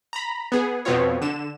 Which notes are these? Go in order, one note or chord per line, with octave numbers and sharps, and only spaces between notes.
A#5 B5
B3 G#4
F2 B2 B3 C4 F4 C#5
D3 E7